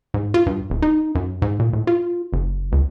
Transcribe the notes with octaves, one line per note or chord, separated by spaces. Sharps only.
G#2
F4
G2
D1
D#4
F#2
G#2
A#2
A2
F4
F#1
C#2